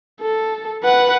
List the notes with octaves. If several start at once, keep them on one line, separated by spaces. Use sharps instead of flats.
A4
B4 F#5